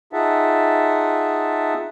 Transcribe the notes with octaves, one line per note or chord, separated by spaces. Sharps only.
D#4 F4 G#4 E5 F#5 A5